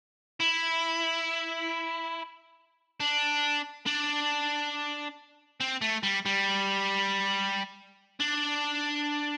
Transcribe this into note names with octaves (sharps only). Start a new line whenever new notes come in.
E4
D4
D4
C4
A3
G3
G3
D4